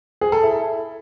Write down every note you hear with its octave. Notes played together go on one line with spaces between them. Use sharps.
G#4
A4
E4